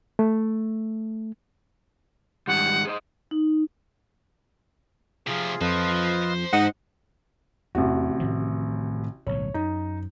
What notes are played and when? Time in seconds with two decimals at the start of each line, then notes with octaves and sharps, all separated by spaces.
0.19 A3
2.47 G#2 D#3 G3 F#5
2.85 G#4 C5 D#5
3.31 D#4
5.27 C3 F3 F4 G#4
5.61 F2 F4 B4 C5 D#5 A5
6.53 G#2 D#4 F#5
7.75 A1 E2 C3 F#4
8.20 A2 D#3 F3
9.27 D1 B1 A2 C#5
9.54 F#2 D#4